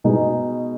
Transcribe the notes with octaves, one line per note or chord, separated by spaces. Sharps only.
B2 G#3 D#4 G#4